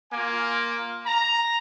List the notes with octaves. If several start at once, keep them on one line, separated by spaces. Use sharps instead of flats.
A#3 F4 G#5
A#5